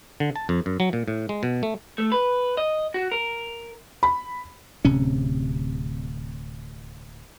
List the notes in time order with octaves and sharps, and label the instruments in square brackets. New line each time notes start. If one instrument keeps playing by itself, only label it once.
[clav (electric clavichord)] D3
A5
F2
F#2
F#3
A#2
A2
G#3
B2
A3
[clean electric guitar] A3
B4
D#5
F#4
A#4
[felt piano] B5
[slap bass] D1 C3 C#4